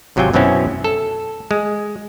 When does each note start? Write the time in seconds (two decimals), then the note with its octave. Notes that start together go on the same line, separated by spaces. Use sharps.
0.16 G#1 C3 F#3 F4 G5 G#5
0.34 F#2 B2 F#3 C4 C#4 E4
0.84 A4
1.51 G#3